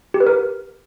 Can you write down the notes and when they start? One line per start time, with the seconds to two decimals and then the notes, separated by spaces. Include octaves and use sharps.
0.14 G4
0.20 B4
0.27 A#4